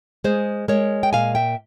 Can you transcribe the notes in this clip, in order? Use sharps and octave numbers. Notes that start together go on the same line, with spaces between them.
G#3 G#4 C5
G#3 A#4 C#5
G5
A#2 F5 G#5
E5 G5